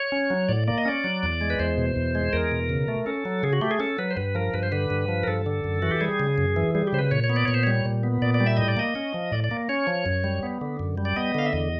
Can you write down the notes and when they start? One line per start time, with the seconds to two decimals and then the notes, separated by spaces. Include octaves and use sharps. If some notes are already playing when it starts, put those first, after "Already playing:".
Already playing: C#5
0.12 C#4
0.30 F#3
0.48 A2 D5
0.68 A#3 D5
0.78 D#5
0.85 C#4 D5
1.04 F#3
1.23 E2
1.41 G#3
1.50 B4
1.59 E2 C5
1.78 B2
1.96 E2
2.15 G#3
2.33 E2 A#4
2.52 B2
2.69 C#3
2.88 A3
3.06 C#4 A4
3.25 F#3
3.43 C#3 G#4
3.53 F#4
3.61 A3 G4
3.71 G#4
3.80 C#4 A4
3.98 F#3 B4
4.11 C5
4.17 G2 B4
4.35 F3 A#4
4.54 G2 B4
4.63 C5
4.72 D3 B4
4.90 G2
5.09 F3
5.23 A#4
5.28 G2 A4
5.46 D3
5.64 F#2
5.82 E3 F#4
5.91 G4
6.01 G3 G#4
6.20 C#3
6.38 F#2
6.56 E3
6.75 G3 G#4
6.87 G4
6.93 C#3 C5
6.99 B4
7.11 A#2 C#5
7.24 C#5
7.30 B3
7.36 D5
7.45 A#2 C#5
7.54 C5
7.63 G3 C#5
7.85 A#2
8.03 B3
8.22 A#2 D5
8.34 D5
8.40 G3
8.47 E5
8.57 A2 D#5
8.68 D5
8.77 A#3 D#5
8.95 C#4
9.14 F3
9.32 A2 D5
9.44 D5
9.51 A#3
9.69 C#4 C#5
9.87 F3
10.06 F#2
10.24 G3
10.43 B3
10.61 D3
10.79 F#2
10.98 G3
11.05 D5
11.16 B3 D#5
11.34 D3 F5
11.46 E5
11.53 E2 D#5